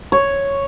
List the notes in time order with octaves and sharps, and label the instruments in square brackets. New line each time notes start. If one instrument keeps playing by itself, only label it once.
[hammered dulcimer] C#5